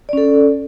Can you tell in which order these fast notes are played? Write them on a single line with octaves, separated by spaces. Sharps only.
D5 C#4 A4